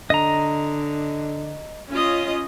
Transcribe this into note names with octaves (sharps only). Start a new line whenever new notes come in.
D3 D#5 A#5
C#4 F4 D#5